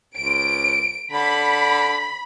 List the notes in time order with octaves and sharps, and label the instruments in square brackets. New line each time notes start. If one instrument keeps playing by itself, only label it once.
[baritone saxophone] C#2 [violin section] D7
[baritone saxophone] D3 [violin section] B5